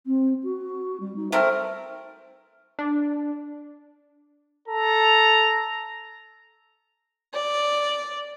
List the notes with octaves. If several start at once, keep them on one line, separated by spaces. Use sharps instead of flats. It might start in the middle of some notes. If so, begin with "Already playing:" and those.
C4
F#4
G3
D#4
A3 C4 A#4 E5
D4
A4 A#5
D5